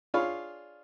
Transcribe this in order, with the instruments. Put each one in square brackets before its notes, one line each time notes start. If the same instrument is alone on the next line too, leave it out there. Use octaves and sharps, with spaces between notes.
[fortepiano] D4 F4 G#4 C#5 F5 B5